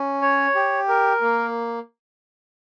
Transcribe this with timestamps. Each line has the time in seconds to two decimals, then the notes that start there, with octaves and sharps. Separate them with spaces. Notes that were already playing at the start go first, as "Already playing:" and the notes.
Already playing: C#4
0.22 C#5
0.55 G4
0.88 A#4
1.21 A#3